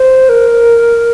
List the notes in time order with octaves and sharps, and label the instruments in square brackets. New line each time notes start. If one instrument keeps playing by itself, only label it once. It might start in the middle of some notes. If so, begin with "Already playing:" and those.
Already playing: [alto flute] C5
A#4